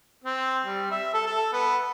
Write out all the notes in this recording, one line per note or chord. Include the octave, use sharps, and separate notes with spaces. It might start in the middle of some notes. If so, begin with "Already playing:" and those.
C4
G3
E5
A4
A4
B3